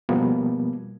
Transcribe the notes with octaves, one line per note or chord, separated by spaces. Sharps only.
B2 F3 G3 A#3 B3